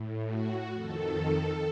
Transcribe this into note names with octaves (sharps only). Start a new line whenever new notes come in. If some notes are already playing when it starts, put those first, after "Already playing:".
Already playing: A2
F#4
F2 D#3 A4